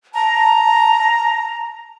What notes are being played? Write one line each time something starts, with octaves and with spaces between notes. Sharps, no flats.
A5 A#5